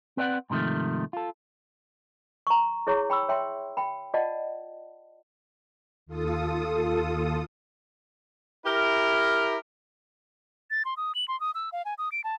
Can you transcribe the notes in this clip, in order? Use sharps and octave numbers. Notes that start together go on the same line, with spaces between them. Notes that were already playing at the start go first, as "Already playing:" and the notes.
C4 B4 D5 F5 F#5
G#2 C3 D#3 F3 A3
F4 A4
A#5 C#6
E4 G#4 C#5 C#6
G5 B5 C#6 E6
C#5 E5 G5 C6
G5 B5
F4 D5 D#5 F#5 A5
D#2 F4 A4 D#6
E4 G4 A#4
A6
C6
D#6
F#7
C6
D#6
E6
F5
G#5
D#6
D7
A5